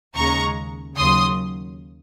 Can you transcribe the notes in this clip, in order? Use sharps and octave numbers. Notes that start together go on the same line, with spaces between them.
D#2 C#3 G#3 A#5 C#6
D#2 C#3 F#3 C6 D#6